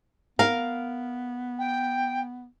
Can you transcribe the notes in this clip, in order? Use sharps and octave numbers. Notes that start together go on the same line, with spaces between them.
B3 A#4 F5
G5